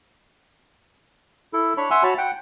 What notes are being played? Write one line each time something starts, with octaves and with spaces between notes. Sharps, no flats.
E4 A4
D4 C#5 B5
E5 F#5 G#5 C6 E6
F#4 C#5 A5 B5
F#5 G5